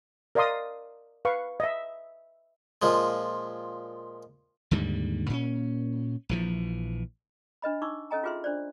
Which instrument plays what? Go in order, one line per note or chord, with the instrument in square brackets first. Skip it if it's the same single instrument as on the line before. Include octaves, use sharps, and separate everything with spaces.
[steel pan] A#4 D5 D#5 F5 C6 D#6
B4 F5 C#6
D#5 E5
[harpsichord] A#2 F3 G#3
[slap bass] D#2 G#2 D3 G3
A#2 C4 C#4
A#1 E3 F3
[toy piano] D4 B4 D#5 B5
D#4 C#6 D6 E6
C#4 A4 D#5 G#5 A#5
F4 F#4 G#4 B4 E5 C6
D4 C5 D5